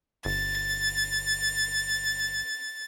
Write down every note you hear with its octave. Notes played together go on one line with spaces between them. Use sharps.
G1 A6